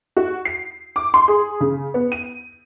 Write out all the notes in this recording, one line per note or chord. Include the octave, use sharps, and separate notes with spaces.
F#4
C7
D6
C6
G#4
C#3
B3
D#7